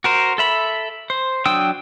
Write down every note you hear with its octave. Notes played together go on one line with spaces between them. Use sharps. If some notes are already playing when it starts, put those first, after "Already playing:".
F#4 A#4 C5
A4 E5 B5
C5
F#3 D4 G5 D#6 E6